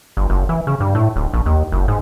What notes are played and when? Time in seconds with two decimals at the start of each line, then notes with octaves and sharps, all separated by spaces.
0.17 G1
0.30 F#1
0.49 E3
0.67 C#3
0.80 G2
0.95 A2
1.16 D1
1.34 A#1
1.46 D#2
1.72 F#1
1.88 G#2